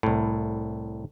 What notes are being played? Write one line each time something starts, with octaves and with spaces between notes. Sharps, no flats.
C2 A2